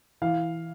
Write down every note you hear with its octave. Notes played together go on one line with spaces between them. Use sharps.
E3 F5